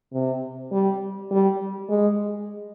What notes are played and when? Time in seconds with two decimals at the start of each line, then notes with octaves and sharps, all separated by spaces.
0.13 C3
0.72 G3
1.31 G3
1.89 G#3